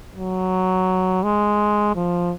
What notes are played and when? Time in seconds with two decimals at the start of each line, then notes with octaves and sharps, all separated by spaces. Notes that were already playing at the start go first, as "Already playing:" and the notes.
0.15 F#3
1.23 G#3
1.95 F3